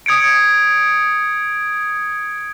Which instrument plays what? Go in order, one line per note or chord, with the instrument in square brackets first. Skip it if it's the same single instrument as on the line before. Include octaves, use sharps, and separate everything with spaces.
[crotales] D#6 G#6 C#7 D7